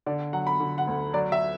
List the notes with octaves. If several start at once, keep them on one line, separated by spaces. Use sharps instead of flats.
D3 D5
F#3 F#5
B5
D3
F#5
D2
F#3 D5
E5